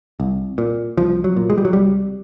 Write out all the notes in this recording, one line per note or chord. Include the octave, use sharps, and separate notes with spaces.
C2
A#2
C2 F3
F#3
A#2
G#3
G3
F#3
C2 G3